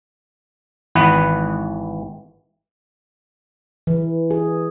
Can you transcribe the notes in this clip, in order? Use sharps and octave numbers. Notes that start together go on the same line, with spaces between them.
G#1 E3 B3 B4
E3
G#4